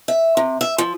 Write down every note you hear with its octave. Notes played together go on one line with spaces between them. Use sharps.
E5
C3
E5
F3